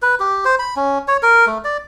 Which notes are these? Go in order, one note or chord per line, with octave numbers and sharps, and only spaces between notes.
B4
G4
C5
B5
C#4
C#5
A#4
A3
D5